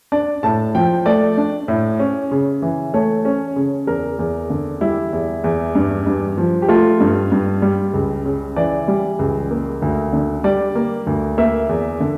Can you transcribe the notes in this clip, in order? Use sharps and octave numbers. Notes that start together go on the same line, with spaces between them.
D4 D5
A2 A5
F3 G5
A3 D5
D4
A2
C#4
C#3
E3
A3 C#5
C#4
C#3
E2 A#4
E2
D3
G3 E4
E2
E2
G2
G2
F3
G4
A3 F4
G2
G2
G3
C#2
C#3
E3 D5
G3
C#2
A#3
D2
D3
G3 D5
A#3
D2
A#3 E5
E2
D3